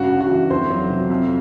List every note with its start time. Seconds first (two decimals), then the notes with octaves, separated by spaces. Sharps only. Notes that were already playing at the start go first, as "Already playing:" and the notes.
Already playing: G2 C#3 F#4
0.10 G2
0.21 F#4
0.30 E3
0.50 F2 C5
0.70 F#3
0.90 C3
1.10 F2